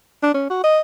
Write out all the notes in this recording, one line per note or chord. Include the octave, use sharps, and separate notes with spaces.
D4
C#4
F#4
D#5